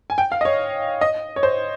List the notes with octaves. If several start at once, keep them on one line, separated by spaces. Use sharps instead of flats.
G#5
G5
F5
D#5
C#5
D#5
C#5
C5